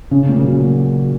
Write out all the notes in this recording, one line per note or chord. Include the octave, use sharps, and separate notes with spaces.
C#3 C#4
A#2
C#3
F#3
F#4